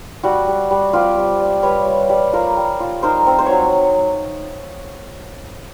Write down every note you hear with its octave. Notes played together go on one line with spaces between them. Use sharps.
G3 F#4
G3
G3
C4 F4 G4
G3
G3
G3 B4 C#5
G3
G3
F4 A#4 C5
G3
F4
D#4 A#4 C5
C4
C5
F#3 C#5